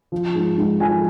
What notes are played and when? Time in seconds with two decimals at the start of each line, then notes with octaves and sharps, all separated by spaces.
0.12 F3
0.35 G#2
0.58 G#2
0.80 F3 G#5